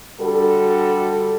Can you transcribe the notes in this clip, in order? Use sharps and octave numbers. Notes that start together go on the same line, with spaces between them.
D3 G3 F#4 A4